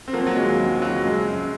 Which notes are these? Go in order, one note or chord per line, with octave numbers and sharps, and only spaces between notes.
C4
F3 F#3 A#3
F#3
D#2 G#3
C#3 F#3
F3 F#3
F#2 G#3
F#2